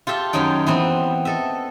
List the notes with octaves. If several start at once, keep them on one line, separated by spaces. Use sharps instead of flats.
F4 G4 A4 E5
F#2 D#3 C#4 D#4 G5
E3 B3 C4
A4 D#5 E5